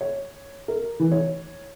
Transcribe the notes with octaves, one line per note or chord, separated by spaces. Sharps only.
C#5
A#4
E3
C#5